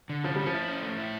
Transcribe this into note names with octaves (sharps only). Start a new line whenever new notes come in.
D3
F3 C#4
G3 C#4
F3
E4
C#4
A3
E4